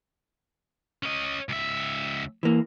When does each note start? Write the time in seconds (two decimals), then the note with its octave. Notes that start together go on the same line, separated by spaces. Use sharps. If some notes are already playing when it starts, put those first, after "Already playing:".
1.03 C#4 D#5
1.49 C#2 E5
2.43 E3 A#3